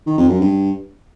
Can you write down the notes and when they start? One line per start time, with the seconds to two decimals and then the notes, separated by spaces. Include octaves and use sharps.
0.06 D#3
0.18 F2
0.30 F#2
0.41 G2